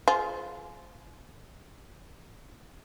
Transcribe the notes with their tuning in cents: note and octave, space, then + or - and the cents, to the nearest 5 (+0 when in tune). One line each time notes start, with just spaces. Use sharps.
F4 +0 G#4 +35 C5 +0